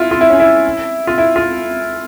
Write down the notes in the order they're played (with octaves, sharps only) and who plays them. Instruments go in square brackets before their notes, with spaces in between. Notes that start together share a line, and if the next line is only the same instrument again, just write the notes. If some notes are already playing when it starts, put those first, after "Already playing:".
Already playing: [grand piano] E4 F4
F4
E4
C#4
E4
F4
E4
F4